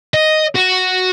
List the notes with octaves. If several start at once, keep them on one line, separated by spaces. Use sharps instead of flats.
D#5
F#4